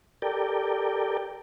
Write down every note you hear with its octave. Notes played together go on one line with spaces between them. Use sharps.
G4 A4 A#4 D5 G5